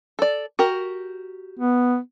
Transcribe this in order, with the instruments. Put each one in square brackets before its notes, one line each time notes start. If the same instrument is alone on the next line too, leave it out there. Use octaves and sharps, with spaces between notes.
[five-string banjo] A4 D5
F#4 G4 A#4
[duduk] B3